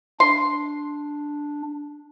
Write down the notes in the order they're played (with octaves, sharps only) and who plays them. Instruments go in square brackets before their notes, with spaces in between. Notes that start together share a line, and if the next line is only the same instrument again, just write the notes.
[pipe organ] D4 [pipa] C6